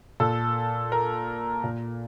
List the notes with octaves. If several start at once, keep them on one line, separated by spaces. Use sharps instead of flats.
A#2 A4
A#4
A#2